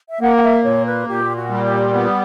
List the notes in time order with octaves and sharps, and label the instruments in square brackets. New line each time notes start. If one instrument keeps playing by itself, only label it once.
[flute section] E5
[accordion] A#3 [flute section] F#5
[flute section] F#5
E5
[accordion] A#2 [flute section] C#5
[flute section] B4
[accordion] A#2 [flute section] G4
[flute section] F#4
[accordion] G3
[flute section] G4
[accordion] B3 [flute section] G4